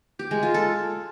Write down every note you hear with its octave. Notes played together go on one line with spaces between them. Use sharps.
G4
G#3
F4
A4